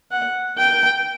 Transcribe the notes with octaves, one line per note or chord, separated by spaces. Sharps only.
F#5
G5